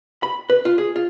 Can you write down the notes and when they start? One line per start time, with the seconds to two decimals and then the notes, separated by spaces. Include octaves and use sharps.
0.23 B5
0.50 B4
0.65 F4
0.78 G#4
0.96 F4